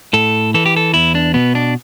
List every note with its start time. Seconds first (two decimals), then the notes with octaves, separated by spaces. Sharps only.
0.13 A2 A4
0.54 E3 A4
0.66 G4
0.76 A4
0.94 E2 E4
1.15 D4
1.34 B2 B3
1.55 D4